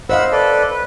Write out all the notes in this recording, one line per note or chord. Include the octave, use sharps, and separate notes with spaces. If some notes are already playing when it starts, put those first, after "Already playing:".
C5 D#5 F5 F#5 B5 E6
A4 B4 D5
B4